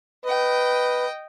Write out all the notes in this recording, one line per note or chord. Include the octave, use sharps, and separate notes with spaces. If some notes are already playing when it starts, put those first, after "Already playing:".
B4 D#5 G5